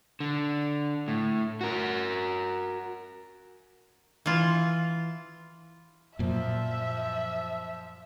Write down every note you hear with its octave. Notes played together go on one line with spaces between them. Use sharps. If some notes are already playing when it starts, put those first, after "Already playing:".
D3
A2
F#4 A#4
E3 F4
F#2 A#2 F3 E5